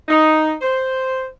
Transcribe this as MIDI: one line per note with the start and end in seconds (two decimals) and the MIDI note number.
0.09 0.53 63
0.61 1.25 72